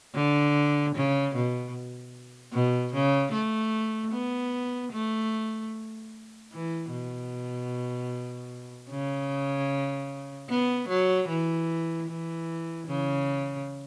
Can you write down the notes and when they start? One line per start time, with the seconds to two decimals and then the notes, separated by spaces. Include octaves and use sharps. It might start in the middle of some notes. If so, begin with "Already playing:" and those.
0.15 D3
0.95 C#3
1.35 B2
2.53 B2
2.94 C#3
3.33 A3
4.12 B3
4.92 A3
6.52 E3
6.91 B2
8.90 C#3
10.49 B3
10.89 F#3
11.28 E3
12.08 E3
12.87 C#3